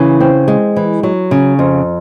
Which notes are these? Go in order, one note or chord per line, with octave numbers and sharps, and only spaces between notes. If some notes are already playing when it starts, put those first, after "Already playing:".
Already playing: C#3 E3
C4
G#3
E3
F#3
C#3
F2